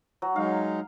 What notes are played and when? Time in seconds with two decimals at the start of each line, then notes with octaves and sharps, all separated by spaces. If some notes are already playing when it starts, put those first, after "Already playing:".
0.22 F#3
0.36 F#3 G#3 D#4 F5